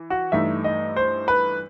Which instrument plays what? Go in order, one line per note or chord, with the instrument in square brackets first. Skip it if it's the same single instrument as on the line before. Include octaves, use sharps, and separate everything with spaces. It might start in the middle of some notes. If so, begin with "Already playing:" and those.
Already playing: [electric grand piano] E3
[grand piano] F#4
[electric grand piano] G2 E3 A3 D#4 [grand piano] E5
[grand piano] D#5
C5
B4